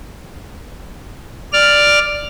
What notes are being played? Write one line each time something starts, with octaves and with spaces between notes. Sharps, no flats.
D5 F6